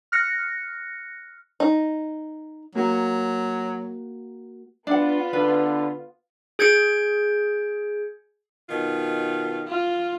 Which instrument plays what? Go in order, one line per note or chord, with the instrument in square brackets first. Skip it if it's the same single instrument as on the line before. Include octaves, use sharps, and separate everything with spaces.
[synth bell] F6 F#6 A#6 C#7
[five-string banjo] D#4
[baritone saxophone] F#3 [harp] A#3 F#4
[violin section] B3 F4 [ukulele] D4 F#5
[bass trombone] D3 [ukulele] B4
[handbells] G#4 G6 G#6 C#7 D7
[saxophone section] B2 D#3 F4
[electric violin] F4